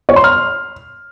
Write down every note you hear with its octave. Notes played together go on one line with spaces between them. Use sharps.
C#5
C6
F6